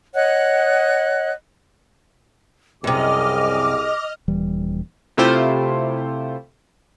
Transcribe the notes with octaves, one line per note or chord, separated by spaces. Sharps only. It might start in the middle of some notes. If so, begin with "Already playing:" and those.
C#5 D#5 F#5 F#6
C2 F#2 C3 G#4 D#5 D6 F6
D#1 E3 G3
C3 A3 E4 F4 G4 C5